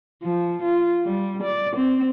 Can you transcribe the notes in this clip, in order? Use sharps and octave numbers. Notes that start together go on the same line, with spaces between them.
F3
F4
G3
D5
C4